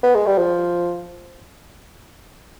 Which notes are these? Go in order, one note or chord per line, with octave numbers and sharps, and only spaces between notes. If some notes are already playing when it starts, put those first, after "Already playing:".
B3
G#3
G3
F3